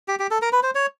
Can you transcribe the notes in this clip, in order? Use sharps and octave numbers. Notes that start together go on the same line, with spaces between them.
G4
G4
A4
A#4
B4
C5
C#5